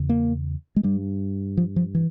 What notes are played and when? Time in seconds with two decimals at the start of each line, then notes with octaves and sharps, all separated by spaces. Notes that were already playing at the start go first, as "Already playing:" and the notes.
Already playing: E2 C#3
0.09 A#3
0.76 G#3
0.83 G2 G3
1.57 F3
1.76 F3
1.95 E3